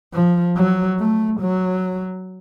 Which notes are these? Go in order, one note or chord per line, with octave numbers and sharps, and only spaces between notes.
F3
F#3
A3
F#3